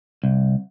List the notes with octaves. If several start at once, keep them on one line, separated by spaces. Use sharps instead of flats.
C2